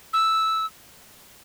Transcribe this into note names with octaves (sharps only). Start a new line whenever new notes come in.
E6